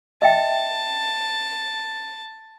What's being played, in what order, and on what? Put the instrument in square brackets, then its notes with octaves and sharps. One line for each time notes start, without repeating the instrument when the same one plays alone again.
[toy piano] D#5 E5 G5 [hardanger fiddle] A5